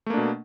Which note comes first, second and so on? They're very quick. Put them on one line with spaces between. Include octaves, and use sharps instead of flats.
A3 A#3 D4 B2